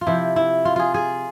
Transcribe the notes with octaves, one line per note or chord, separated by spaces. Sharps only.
F4
C3 F3 E4
E4
F4
F4 G#4
G#4